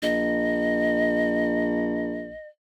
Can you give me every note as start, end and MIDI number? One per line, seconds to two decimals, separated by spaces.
0.02 2.33 34
0.02 2.47 75